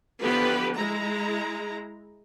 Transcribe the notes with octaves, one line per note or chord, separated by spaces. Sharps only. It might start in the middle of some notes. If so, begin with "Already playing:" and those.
D3 E3 F3 B3 G4 B4
G#3 E4 A#5